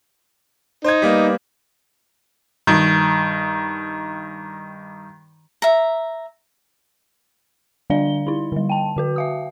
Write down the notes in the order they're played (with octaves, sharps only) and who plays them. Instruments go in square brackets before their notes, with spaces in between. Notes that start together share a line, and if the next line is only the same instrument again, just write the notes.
[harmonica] D#4 [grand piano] C5 G#6
[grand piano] G3 A#3 B3
[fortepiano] G2 D#3
[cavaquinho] E5 A#5
[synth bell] D3 G3 D4 D5 F5 G7
D#4 E4
D3 G3
G5 A5
D3 F#4 B4
E5 F5 D#6